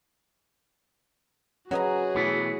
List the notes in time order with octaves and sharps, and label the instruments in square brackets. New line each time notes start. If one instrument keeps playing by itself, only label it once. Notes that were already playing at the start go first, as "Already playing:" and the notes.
[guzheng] F#3 D#5 A#5 [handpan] C#4 B4 [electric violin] F#4 G#4
[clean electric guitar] B2 E3 B3 [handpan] A3 E4